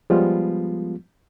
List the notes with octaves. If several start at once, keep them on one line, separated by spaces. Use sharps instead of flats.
F3 G3 G#3 B3 F4